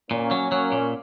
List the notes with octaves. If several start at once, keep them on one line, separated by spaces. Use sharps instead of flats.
A#2 A#3 C#4
F#3
F#3
A#2